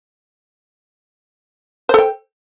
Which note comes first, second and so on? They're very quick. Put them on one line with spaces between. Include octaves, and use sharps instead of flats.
C5 A4 G5